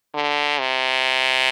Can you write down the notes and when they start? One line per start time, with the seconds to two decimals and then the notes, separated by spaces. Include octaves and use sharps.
0.14 D3
0.60 C3